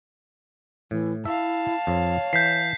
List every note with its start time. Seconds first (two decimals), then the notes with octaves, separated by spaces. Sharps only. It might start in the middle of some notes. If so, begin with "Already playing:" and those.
0.91 A2 E3
1.25 E4 E5 F5 A5
1.87 F2 C#5
2.33 E3 G6 B6 C7